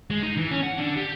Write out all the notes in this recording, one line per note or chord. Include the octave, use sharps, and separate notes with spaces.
G#3
D#4
E3
C#4
F#5
D3
G4